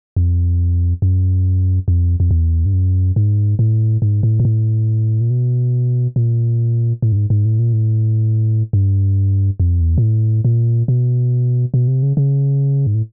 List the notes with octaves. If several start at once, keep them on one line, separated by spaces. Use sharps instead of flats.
F2
F#2
F2
F2
E2
G2
F#2
G#2
A2
G#2
A2
A#2
A2
A#2
B2
A#2
A2
G2
G#2
G#2
A2
A#2
A2
G2
F2
E2
A#2
A2
A#2
B2
B2
C3
C#3
C#3
G#2
A2